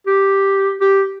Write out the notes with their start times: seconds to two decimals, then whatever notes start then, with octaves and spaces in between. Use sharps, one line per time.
0.07 G4
0.81 G4